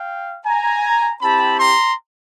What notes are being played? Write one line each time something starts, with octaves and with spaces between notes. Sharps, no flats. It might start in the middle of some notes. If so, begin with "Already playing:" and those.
Already playing: F5 G5
G#5 A#5
C4 E4 G4 A5 B5
A#5 C6